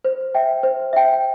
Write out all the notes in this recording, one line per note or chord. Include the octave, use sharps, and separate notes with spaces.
C5
E5 G5
C5
E5 G5